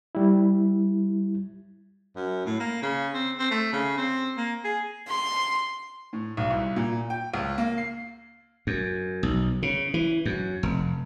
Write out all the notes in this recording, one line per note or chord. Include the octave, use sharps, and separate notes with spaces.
G3 E4
F#2
A2
A#3
C#3
C4
C4
A3
C#3
C4
A#3
G#4
C6
A2
B1
C2
A#2
G5
C#2
A#3
C7
F#2
B1
C#3
E3
F#2
F1